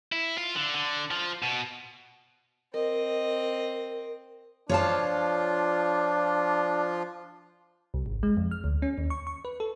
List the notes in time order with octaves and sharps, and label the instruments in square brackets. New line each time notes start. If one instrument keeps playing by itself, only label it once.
[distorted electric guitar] E4
F4
D3
D3
F3
B2
[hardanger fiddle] C4 D#5 [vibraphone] A#4
[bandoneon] F3 F4 [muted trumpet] D4 [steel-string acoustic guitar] C#5 F5 A5
[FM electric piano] C2
G#1
G#3
F2
F6
D2
C#4
D#2
C#6
C#6
B4
A4